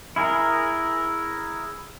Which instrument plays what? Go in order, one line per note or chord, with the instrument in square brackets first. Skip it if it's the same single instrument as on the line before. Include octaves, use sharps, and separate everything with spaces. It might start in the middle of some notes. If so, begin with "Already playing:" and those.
[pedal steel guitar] E4 G#4 A#4